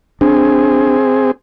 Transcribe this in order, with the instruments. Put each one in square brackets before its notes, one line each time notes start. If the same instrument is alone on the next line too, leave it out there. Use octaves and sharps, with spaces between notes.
[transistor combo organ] C4 G#4 [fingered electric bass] D4